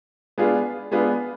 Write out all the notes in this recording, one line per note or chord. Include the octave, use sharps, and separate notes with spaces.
G#3 B3 D4 F4 G#4
G#3 B3 D4 F4 G#4